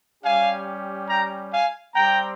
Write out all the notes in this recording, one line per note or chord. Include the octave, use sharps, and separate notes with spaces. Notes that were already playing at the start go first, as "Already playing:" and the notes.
G3 C#4 G4 F5 G#5
G5 A#5
F5 G#5
G3 C4 G4 G5 A#5